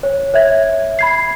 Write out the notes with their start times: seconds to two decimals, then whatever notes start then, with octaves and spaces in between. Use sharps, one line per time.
0.03 C#5
0.34 C#5 E5 G#6
0.99 B5 G#6 C7